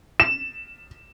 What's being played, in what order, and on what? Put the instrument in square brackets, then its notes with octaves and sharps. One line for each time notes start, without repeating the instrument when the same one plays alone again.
[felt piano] E7